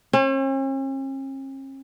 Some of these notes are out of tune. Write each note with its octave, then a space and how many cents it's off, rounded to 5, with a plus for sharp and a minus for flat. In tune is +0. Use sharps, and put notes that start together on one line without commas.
C#4 -45